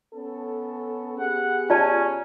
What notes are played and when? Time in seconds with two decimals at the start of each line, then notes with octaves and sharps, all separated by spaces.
0.14 B3 C#4 A4
1.19 B3 G4 G#4 F#5
1.70 C#4 F4 D5 A5